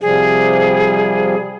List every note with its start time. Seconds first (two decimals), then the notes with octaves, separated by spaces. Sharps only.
0.01 C3 F3 G3 G#4